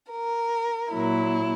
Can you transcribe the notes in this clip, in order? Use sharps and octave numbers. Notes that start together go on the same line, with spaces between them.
A#4
A#2 F#3 E4